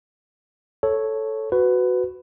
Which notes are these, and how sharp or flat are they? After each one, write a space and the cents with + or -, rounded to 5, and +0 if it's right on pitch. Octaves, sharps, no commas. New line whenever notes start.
A4 -5 C#5 -5
F#4 +0 B4 +15